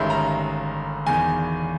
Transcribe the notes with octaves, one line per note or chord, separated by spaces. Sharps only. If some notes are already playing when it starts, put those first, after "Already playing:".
Already playing: G1 G2 D#3 G#3 C#4 E5
A#5
E1 E2 D#3 G#5